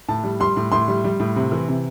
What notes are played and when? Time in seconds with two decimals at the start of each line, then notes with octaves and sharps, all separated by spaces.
0.08 A2 A5
0.24 G3
0.40 G3 C6
0.56 A2
0.72 A2 C6
0.88 G3
1.04 G3
1.20 A2
1.36 C3
1.52 E3
1.68 C3